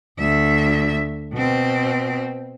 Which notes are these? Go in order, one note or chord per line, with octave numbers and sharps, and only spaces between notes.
D2 E5
B2 C4